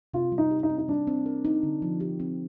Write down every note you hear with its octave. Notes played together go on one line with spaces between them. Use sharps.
C3 F4
G3
D#4
G4
D#4
C4
D#4
G3 D4
C4
A#4
D#4
D3
F3
G4
C4